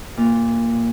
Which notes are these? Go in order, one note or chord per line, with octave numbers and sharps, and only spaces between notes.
A#2